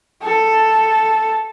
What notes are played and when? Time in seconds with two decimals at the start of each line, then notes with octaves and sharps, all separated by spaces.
0.23 A4